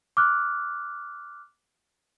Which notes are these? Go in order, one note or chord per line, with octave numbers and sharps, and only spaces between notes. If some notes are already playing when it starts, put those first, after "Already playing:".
D6 F6 F#6